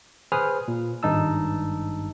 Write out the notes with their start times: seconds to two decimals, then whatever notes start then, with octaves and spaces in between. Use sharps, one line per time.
0.32 G#4 B4 C5 G#5 D#6 F6
0.68 A#2
1.03 G#1 G2 D#4 A5 E6